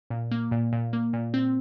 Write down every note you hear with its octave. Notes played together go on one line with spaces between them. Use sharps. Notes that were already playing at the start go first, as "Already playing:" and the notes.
A#2
A#3
A#2
A#2
A#3
A#2
C4